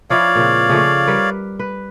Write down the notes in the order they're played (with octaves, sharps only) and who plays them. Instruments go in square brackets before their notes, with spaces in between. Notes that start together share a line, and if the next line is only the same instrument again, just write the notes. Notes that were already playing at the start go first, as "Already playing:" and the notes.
[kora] F3 D4 E4 [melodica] C#5 D5 F5
[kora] A#2 C#3 C4
C#3 F3 A3
G3 A#4 B4
B4